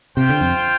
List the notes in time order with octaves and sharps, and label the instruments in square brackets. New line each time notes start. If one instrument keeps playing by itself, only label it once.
[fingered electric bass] C3 [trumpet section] F4 C5 G5
[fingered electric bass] D3
F2